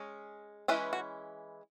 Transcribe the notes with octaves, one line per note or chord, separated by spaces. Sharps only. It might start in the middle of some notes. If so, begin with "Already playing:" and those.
Already playing: G#3 C#4
E3 G#3 C#4 E4 B4
F#4